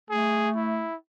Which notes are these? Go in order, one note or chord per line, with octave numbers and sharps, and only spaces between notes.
A3 G#4
E4